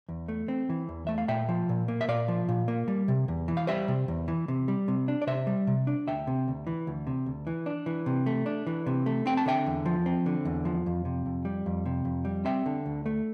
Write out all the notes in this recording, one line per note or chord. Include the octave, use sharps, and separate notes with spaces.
E2
A3
C4
E3
E2
A3 E5
F5
A#2 E5 G5
F3
A#2
A#3
E5
A#2 D5 F5
F3
A#2
A#3
G3
C3
E2
E3
F5
G3 C5 E5
C3
E2
E3
C3
G3
C3
D4
D5
C3 C5 E5
G3
C3
D4
D2 E5 G5
C3
D2
E3
D2
C3
D2
E3
D4
E3
C3
A3
D4
E3
C3
A3
C4 G5
A5
D3 E5 G5
E2
F3
C4
D3
E2
F3
F2
C3
F2
G3
F2
C3
F2
G3
C4 E5 G5
D3
D2
A3